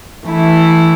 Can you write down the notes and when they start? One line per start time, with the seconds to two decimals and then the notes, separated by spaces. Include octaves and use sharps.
0.25 E3 A3 E4